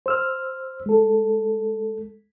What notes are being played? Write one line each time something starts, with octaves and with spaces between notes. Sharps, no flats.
C5 E6 F6
G#3 A4